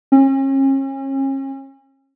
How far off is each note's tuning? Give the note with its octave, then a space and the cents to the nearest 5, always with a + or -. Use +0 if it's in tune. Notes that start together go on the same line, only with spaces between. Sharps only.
C#4 -40